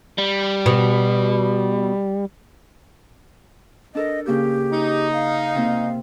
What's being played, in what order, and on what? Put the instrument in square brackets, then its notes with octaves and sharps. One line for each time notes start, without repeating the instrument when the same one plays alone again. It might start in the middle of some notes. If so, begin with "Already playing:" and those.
[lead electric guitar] G3
[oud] B2
[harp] D4 A4 A#4 [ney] D#5
[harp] C#3 A#3 G6 [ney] G4
[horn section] D#4
[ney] F5
[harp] C3 A#3